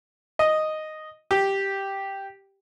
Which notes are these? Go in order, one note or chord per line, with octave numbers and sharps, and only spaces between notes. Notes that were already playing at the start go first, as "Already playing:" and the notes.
D#5
G4